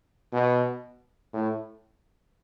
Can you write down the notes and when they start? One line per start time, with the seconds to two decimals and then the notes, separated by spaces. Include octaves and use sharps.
0.33 B2
1.33 A2